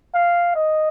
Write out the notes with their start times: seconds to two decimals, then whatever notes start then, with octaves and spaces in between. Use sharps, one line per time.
0.14 F5
0.55 D#5